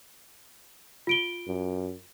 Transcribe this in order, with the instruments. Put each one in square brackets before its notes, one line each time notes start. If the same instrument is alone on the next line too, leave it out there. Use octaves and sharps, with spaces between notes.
[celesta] F4 D7 G7
[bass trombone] F#2